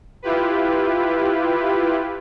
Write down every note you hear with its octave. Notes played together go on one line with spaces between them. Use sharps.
E4 F4 G4 B4